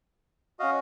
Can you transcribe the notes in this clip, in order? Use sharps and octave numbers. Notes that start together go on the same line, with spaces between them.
C#4 F#4 D#5 F5